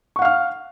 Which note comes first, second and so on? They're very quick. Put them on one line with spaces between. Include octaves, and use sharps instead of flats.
C#6 F#5 F5 F6